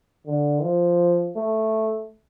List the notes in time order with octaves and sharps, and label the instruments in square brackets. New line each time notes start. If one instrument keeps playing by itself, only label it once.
[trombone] D3
F3
A3